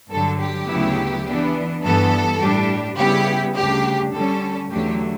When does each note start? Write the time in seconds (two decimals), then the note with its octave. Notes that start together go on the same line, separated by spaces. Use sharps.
0.11 G2 D3 F#3 A4
0.39 G4
0.68 D2 C#3 F#3 B3 E4
1.26 E3 B3 D4
1.83 G2 E3 B3 A4
2.40 A2 G3 D4 G4
2.98 C#3 G3 B3 E4 G4
3.56 D2 C#3 G3 D4 G4
4.13 D3 G3 C#4 A4
4.70 E2 D3 F#3 A3 G4